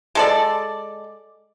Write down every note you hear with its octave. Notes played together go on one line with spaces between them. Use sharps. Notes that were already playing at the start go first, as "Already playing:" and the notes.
G#3 A4 D5